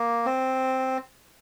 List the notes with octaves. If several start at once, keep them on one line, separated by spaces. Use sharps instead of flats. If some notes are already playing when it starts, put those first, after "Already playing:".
Already playing: A#3
C4